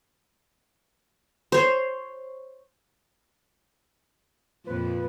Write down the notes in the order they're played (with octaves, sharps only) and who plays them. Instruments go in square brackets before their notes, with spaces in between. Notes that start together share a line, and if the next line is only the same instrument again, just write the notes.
[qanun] C5 C#5
[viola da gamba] F2 A#2 F3 [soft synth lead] B4